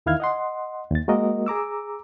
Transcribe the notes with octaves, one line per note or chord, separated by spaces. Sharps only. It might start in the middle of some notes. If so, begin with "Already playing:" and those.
E2 D#3 E4 F5 F6 G#6
D#5 F#5 C6
D#2 A6
G#3 A#3 F#4 A#4 D#5
G#4 A#5 D6 E6